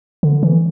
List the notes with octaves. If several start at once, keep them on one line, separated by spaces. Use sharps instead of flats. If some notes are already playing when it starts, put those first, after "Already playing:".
D3
E3